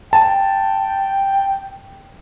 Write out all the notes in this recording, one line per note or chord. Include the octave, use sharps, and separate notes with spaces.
G5 A5